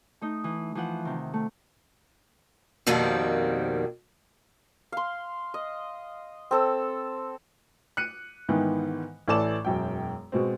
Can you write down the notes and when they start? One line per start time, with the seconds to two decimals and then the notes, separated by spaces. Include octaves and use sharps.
0.21 A3 D#4
0.44 E3
0.75 E3 F3 F#5
1.05 C3 D#3
1.34 A3
2.87 F2 B2 D#3 G3 A#3 C4
4.92 F5 C6
5.54 D#5
6.51 C4 A4 E6
7.97 F#6 C#7 D#7
8.49 G#2 D#3 E3 B3
9.28 A1 E3 A4 D5 A5 E7
9.65 E1 F#2 G5
10.32 B2 G#3 C4